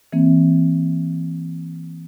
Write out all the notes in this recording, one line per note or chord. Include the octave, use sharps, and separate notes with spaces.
E3 A#3 C4